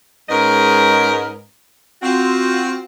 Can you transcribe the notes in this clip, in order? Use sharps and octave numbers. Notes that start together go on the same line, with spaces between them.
G#2 G#3 C#4 A#4 B4 D#5
C4 F4 F#4